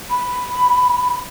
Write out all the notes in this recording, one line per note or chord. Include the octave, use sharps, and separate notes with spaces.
B5